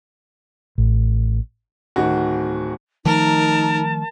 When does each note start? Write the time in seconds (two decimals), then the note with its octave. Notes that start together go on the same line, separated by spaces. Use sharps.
0.78 A1
1.96 D1 D#3 F#4
3.05 D#3 F3 A3 D#4 A#4 A5